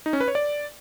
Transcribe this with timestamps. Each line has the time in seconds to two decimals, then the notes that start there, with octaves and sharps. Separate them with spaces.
0.06 D#4
0.13 C#4
0.20 B4
0.28 C#5
0.35 D5